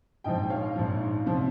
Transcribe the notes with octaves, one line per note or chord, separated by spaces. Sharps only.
A#1 G#2 F3 D#5 G5
G5
C#5 F5
A#1 G#2 F3
C2 C3 F3